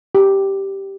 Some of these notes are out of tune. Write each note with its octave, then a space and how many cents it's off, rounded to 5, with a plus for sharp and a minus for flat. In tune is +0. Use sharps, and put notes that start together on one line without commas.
G4 -5